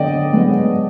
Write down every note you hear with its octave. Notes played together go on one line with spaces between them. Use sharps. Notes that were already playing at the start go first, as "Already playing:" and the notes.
Already playing: D3 B3 D5 D#5 G5
G#3 B3